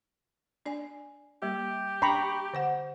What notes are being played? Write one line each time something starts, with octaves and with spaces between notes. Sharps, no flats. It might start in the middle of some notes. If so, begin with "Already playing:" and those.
D4 D5 G#5
G3 A#3 G4
D4 G5 A#5 B5 C#6
D3 C5 F#5